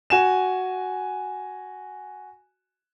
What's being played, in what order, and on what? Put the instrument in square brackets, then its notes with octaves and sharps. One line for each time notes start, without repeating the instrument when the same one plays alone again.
[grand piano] F#4 G#5 E7